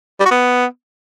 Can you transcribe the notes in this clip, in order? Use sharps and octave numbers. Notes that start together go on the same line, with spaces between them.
G3
F#4
B3